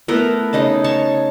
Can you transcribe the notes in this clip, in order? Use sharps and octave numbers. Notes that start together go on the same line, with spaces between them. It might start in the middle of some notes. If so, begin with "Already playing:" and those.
A3 B3 E4 A#4
C#3 D#4 D#5 A5
C#5 A5 C#6